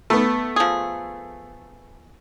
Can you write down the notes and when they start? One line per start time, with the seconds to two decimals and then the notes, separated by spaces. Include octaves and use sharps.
0.10 A3 B3
0.56 F3 G#4